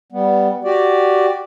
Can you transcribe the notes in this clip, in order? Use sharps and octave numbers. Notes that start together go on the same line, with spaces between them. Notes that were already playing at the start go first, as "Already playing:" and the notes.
G3 B3
F#4 G4 D5